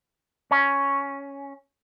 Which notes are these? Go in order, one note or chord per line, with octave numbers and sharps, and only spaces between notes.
C#4